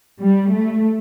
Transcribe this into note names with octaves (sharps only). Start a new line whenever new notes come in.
G3
A3